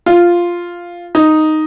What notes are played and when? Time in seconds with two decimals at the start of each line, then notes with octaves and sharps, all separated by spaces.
0.06 F4
1.15 D#4